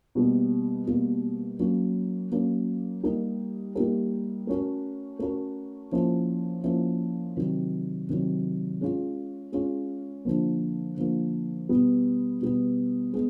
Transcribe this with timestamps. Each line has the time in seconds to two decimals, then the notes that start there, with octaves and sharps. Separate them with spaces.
0.15 B2 G3 A#3
0.87 B2 G3 A#3
1.59 F#3 A#3 C#4
2.32 F#3 A#3 C#4
3.03 G3 A#3 D#4 G4 A#4
3.75 G3 A#3 D#4 G4 A#4
4.47 A3 C#4 F#4 A#4
5.19 A3 C#4 F#4 A#4
5.92 F3 A#3 C#4 E4
6.64 F3 A#3 C#4 E4
7.37 C3 D#3 F#3
8.09 C3 D#3 F#3
8.81 G#3 C#4 F4
9.52 G#3 C#4 F4
10.25 D3 F3 A#3
10.97 D3 F3 A#3
11.69 B2 G3 B3
12.41 B2 G3 B3
13.13 G#3 B3